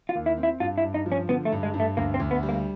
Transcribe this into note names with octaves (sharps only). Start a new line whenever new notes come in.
F4
D#2
E4
C4
E4
G2 F4
E4
G2
D#4
F3
C#4
D3 B3
A3
G2
G#3
G2
A3
D2 A#3
C4
D2
B3
G3
A#3